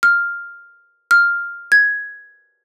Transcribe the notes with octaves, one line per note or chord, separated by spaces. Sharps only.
F6
F6
G#6